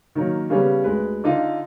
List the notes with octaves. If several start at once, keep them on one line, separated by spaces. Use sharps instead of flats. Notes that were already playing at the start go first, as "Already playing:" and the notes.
D#3 F#3 A#3 A#4 C#5
C#3 G3 B3 C#4
D2 G#3 B4
D3 D#4 F4